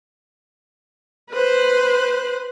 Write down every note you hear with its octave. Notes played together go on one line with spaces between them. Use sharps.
B4 C5 F#6